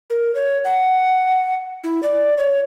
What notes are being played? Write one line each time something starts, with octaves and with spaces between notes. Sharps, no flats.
A#4
C#5
F#5
E4
D5
C#5